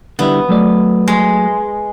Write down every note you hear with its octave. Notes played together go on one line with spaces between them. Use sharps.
D3 G3 B3 E4
F#3 A3 D5
G#3